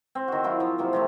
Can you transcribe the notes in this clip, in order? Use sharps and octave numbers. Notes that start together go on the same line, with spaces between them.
C4
D#3 F#4
F#3 E4 F4
F3
C3 F3 F#3 A#3
C3 F3 A3